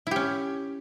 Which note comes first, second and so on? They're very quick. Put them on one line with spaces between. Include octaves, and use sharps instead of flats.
E4 G4 C#4